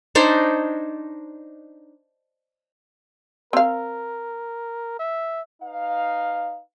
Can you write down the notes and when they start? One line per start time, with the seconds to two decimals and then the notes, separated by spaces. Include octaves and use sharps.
0.15 D4 D#4 C5 C#5
3.53 C4 A#4 F5
4.99 E5
5.63 D#4 B4 F5